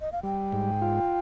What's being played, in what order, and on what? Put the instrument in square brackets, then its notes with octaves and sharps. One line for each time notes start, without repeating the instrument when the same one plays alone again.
[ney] D#5
F5
[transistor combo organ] G3 [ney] G5
[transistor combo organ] G#2
F4